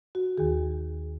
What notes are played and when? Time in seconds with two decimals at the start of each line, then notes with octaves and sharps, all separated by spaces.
0.15 F#4
0.38 D#2 D#3 G#4